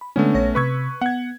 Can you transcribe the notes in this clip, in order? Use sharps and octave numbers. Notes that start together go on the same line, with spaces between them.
B5
D3 G#3 A3 B3 C#4 D4
A#1 C#5 A#6
C3 B4 C#6 E6 G#6 B6
B3 F#5 G#6